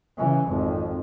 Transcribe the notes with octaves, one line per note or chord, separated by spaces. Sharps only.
C#3 E3
G#1 F2